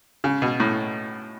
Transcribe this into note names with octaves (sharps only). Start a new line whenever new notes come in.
C#3
B2
A2